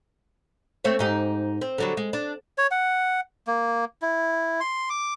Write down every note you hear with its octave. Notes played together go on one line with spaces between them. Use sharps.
A3 C4 C#5
G#2 D#4 G4
C4
D3 F#3 G3
G#3
D4
C#5
F#5
A#3
E4
C6
D6